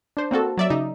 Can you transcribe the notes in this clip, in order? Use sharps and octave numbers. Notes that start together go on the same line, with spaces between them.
D4 C5
A#3 C4 F#4 A4
F#3 D5 E5
C#3 D#4